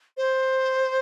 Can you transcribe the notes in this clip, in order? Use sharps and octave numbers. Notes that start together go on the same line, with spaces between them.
C5